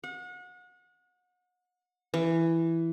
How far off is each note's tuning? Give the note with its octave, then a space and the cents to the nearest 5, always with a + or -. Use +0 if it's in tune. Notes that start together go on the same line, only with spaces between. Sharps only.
F#5 -35
E3 +5